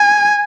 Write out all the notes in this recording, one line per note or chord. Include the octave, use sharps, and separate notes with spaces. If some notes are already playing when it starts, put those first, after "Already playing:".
Already playing: G#5